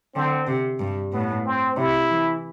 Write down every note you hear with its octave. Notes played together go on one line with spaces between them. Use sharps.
D3 C4
C3
G2
A2 B3
C4
C3 E4
E3